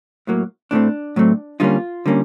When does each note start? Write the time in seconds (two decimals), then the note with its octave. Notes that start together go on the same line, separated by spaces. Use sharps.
0.27 A2 F#3 A#3
0.71 A2 F#3 A3 C4 D4
1.16 A2 F#3 A3 C4
1.60 D3 G3 A#3 C#4 D#4 F4
2.06 D3 G3 A#3 C#4